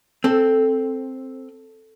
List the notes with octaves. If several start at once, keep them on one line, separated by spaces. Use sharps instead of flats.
C4 A4